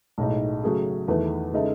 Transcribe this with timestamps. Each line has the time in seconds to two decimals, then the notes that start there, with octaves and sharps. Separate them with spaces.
0.18 B1 A2 G#3 D#4
0.63 C#3 F#3 A3 C#4 G#4
1.08 E2 D#3 A3 E4 B4
1.53 C#3 G#3 D#4 A4 E5